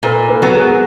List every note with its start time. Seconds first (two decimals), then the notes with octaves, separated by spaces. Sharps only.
0.03 A#2 A4 B4
0.28 A4 B4
0.42 F#3 B3
0.54 G#4 A#4
0.69 G#4